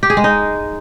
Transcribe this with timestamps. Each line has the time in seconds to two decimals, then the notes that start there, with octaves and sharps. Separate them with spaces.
0.03 G4
0.10 G#4
0.17 G#3
0.24 D#4